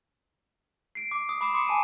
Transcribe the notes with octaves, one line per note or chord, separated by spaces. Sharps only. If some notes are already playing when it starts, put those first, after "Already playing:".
C7 D7
D6
D#6
B5 D6 D#6 C7 E7
C6 D6 C#7 E7
G#5 A5 D7 D#7